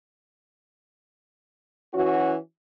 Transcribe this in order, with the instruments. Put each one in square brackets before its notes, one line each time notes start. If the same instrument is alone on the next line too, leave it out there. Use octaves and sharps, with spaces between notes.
[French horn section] E3 C#4 F#4